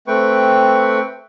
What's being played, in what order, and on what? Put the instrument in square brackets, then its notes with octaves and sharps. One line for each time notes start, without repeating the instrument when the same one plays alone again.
[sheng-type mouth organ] A3 C4 B4 G5 C#6